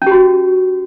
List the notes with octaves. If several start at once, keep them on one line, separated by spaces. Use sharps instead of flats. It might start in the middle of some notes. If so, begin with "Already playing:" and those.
C#4 F#4 G4